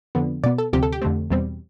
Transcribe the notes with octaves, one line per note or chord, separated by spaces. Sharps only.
F2 D3 F3 B3
B2 B3 D5
A4
D2 C3 F3 C4 G4
A4
G4
F2 D3 A3 C4
E2 B2 G3 C4